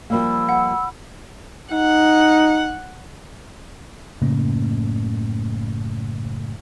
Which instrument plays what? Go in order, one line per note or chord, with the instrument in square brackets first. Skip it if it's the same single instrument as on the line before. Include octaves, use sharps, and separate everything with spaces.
[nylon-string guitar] F3 G3 A#3 [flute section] B5 E6
[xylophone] F#5
[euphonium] D#4 [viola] F#5
[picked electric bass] F#1 A2 C#3 A#3